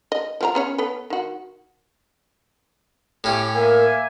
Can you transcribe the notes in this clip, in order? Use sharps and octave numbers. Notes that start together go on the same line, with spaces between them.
D#5
F3 C4 A#5
B3 C#4 C#5
B3 A4 B4
D#3 F#4
A2 C#4 G4
A#3 A#4 E5 G#5